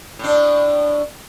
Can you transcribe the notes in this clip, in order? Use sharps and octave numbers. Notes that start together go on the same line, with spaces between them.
A2 D4